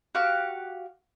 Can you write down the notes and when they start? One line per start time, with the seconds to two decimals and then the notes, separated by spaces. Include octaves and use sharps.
0.15 F#4 G4 F5 C#6